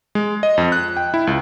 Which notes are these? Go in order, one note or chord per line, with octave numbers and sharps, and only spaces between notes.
G#3
D#5
F2
F#6
G5
E4
C#2